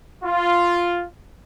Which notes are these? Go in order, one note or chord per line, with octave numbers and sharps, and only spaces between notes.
F4